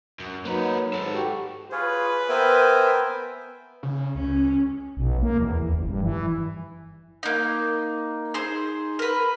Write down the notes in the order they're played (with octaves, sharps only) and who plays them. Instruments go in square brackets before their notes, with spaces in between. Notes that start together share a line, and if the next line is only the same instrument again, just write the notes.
[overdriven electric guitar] F#2
[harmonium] F#3 D#4 [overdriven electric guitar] A#3 B4
[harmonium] G#2 [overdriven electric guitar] A4 B4
[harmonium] F#4 G4
[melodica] F4 G#4 C#5 [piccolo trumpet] B4
[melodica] B3 G5 G#5 [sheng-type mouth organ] A#4 C5 E5
[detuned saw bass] C#3
[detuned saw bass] C#2 [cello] C#4
[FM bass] B1
A#3
E2
E2
F#1
G2
E3
[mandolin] A#3 D#4
D#4 G#4 C5
A#4 B4